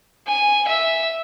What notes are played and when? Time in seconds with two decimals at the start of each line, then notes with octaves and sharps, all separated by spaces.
0.27 G#5
0.68 E5